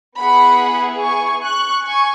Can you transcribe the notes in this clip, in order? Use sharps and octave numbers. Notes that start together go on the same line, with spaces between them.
B3 E4 G#4 F#5 B5
G#5 C#6
C#6 F#6
G#5 C#6